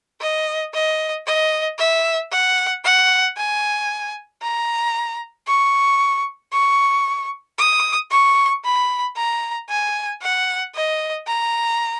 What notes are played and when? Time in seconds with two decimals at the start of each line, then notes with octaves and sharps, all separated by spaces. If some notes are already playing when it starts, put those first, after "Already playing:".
0.21 D#5
0.74 D#5
1.27 D#5
1.79 E5
2.32 F#5
2.84 F#5
3.37 G#5
4.42 A#5
5.47 C#6
6.53 C#6
7.58 D#6
8.11 C#6
8.64 B5
9.16 A#5
9.69 G#5
10.22 F#5
10.75 D#5
11.27 A#5